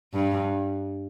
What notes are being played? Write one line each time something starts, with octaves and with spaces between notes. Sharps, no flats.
G2